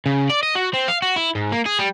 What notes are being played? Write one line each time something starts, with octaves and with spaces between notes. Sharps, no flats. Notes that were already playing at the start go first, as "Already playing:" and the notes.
C#3
D5
D#5
F#4
C4
F5
F#4
E4
G#2
A#3
G#4
G3